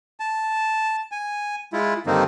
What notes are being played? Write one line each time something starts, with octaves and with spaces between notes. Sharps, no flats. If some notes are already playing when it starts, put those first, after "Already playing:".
A5
G#5
G#3 E4 F4
G2 D3 D#3 A#3 C4 D#4